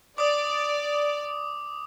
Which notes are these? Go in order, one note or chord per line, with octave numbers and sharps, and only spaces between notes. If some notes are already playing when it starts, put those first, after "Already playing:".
D5 D6 D#6